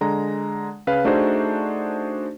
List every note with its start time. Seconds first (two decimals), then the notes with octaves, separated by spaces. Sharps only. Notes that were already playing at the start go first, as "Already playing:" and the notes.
0.01 D3 G#3 A#5
0.87 C#3 B4 F5
1.05 A3 D4 D#4 F#4 G#4 C5